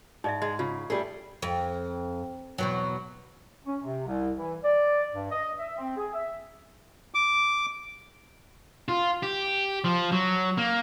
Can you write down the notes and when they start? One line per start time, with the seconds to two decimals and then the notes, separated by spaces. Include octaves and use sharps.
0.24 G#2 D#4 D5 E5
0.42 G#3 D#5
0.59 C#3 F4
0.90 G3 A3 G#4
1.42 F2
2.58 E2 B2 F#3
3.66 C#4
3.81 C3
4.07 C2
4.36 E3
4.63 D5
5.13 G2
5.31 D#5
5.59 E5
5.77 C4
5.97 G#4
6.12 E5
7.14 D6
8.88 F4
9.23 G4
9.84 F3
10.12 F#3
10.58 A#3